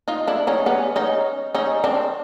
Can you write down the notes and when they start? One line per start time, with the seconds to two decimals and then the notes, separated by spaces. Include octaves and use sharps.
0.08 D#4 F4
0.27 D4 E4
0.47 C#4 D#4
0.66 B3 C#4
0.96 C#4 D#4
1.55 C#4 D#4
1.84 C4 D4